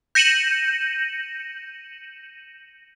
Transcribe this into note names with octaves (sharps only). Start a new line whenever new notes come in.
G6 A#6 C#7 D#7 E7 F#7